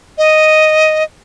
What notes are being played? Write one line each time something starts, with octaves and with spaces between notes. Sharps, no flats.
D#5